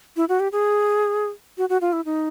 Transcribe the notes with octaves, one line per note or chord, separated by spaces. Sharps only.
E4
F#4
G4
G#4
F#4
F#4
F4
E4
D#4